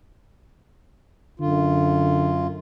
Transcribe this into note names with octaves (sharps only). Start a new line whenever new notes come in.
F#2 D3 F4